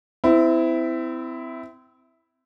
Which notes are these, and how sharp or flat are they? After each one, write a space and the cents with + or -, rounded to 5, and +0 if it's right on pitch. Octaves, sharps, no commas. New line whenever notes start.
C4 -30 E4 +0